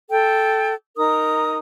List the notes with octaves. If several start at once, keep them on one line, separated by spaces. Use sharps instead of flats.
A4 G5
D#4 A#4 D#6